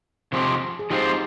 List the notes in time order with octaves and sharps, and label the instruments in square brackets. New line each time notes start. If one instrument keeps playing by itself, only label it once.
[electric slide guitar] C3 F3 G#3 C4 G4
[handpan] G#4
[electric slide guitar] F3 G#3 C4 F4 C5 [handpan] D#4 G4